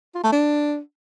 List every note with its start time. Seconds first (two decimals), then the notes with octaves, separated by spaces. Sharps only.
0.15 F4
0.24 A3
0.32 D4